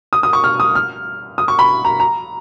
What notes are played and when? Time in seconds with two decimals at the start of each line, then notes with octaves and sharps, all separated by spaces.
0.13 D#6
0.23 D#6
0.33 C#6
0.44 F6
0.60 D#6
0.75 F6
1.38 D#6
1.48 C#6
1.59 B5
1.85 A#5
2.00 A#5